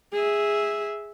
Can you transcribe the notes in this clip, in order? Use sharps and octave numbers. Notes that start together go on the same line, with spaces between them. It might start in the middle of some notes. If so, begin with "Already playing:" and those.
G#4 E5